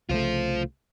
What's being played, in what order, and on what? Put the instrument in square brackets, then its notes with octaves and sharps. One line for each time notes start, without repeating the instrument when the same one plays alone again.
[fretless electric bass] C2 C#3 A3 [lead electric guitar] F4 C5